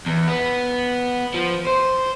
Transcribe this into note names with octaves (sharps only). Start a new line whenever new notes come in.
E2
B3
F3
C5